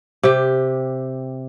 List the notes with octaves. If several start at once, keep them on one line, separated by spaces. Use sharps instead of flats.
C3 G4